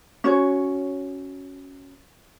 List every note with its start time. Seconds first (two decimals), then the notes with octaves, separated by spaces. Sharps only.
0.24 C#4 F#4 C#5